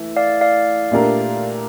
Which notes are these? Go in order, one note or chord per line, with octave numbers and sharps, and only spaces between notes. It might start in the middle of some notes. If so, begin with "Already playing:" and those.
Already playing: E3 A3
D5 F5
D5 F5
A#2 A3 D4 G4 A#4